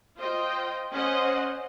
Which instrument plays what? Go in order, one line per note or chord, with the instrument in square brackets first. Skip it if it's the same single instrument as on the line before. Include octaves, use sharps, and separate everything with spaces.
[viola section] F4 C5 D#5 G5
C#4 C5 D#5 F#5